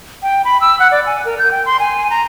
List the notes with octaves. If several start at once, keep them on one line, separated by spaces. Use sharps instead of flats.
G5
B5
E6
F#5
D5
G#5
A#4
G6
G5
C6
G#5
A#5